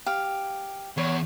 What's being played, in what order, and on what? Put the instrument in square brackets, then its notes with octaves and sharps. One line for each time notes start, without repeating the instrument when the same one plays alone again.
[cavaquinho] G4 F5
[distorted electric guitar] E2 [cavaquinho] C#5